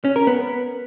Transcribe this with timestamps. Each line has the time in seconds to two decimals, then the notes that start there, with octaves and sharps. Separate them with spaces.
0.05 C#4
0.16 A#4
0.27 B3